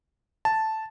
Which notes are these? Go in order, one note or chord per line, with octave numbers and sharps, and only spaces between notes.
A5